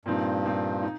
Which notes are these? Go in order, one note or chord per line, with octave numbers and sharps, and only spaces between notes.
G2 A#2 F3 C4 D#4
A#2 F3 C4 D#4
D#4